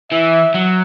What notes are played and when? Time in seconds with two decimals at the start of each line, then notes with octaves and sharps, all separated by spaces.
0.11 E3 E5
0.54 F#3